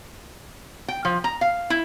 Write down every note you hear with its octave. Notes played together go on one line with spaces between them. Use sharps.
G5
F3
A#5
F5
E4